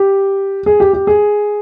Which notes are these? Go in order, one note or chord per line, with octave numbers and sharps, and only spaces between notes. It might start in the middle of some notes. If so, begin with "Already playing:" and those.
Already playing: G4
G#4
G4
G4
G#4